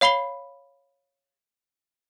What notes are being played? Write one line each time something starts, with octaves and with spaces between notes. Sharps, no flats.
C#5 F5 B5 C7 G7